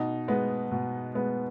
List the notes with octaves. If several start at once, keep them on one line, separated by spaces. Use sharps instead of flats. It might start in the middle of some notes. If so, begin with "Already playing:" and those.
Already playing: B2 D#4
G#3 B3
B2
G#3 B3